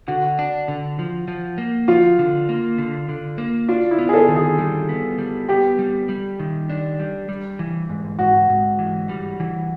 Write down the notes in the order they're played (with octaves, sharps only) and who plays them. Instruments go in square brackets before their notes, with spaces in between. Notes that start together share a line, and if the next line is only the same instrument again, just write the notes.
[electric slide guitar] D3 [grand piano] F#4
[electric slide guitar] D4
D3
F3
F3
A#3
[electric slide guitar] F3 [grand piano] F4
[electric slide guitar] D3
A#3
D3
D3
A#3
[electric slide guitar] D4 [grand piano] F4
[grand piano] E4
[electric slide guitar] B3
[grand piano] G#4
A4
[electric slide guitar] D#3
[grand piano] G#4
[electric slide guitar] G3
B3
G3
[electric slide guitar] B3 [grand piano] G4
[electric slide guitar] G3
G3
D#3
D4
G3
G3
E3
G#2
[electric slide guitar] G#2 [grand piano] F#4
[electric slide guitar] G#2
E3
G3
E3